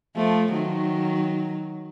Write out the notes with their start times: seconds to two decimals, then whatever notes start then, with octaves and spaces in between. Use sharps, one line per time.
0.16 F3 A3
0.52 D#3 F#3